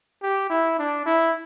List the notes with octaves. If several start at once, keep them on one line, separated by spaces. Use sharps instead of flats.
G4
E4
D4
E4